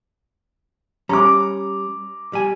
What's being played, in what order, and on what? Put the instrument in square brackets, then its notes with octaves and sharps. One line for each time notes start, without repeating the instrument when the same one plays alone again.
[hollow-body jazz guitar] G3 C#4 [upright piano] A#5 D6
[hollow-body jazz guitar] G3 G#5